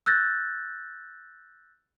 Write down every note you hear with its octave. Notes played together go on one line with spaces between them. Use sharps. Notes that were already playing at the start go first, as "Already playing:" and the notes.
E6 F#6 G6 A6 A#6